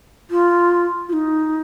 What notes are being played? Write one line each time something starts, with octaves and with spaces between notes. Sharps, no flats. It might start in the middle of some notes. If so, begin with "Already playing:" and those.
F4
F4
D#4